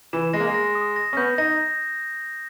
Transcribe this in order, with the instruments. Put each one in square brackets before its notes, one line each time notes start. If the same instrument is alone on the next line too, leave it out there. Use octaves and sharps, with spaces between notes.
[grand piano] E3 [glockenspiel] E7
[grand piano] G#3 [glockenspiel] A#6
[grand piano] A#3
G#3
[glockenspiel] A#6
D#6
A#6
[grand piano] C#4
[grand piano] B3 [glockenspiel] G6
[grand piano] D#4 [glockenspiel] A#6